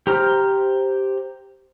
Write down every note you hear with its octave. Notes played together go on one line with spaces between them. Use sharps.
G4 C5 A#5 F6